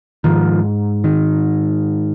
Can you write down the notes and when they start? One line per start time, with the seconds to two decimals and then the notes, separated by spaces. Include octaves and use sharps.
0.24 G#2 D#3 F3
1.04 D#3